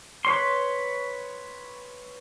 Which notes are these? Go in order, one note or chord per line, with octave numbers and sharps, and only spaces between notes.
B4 C#5 C6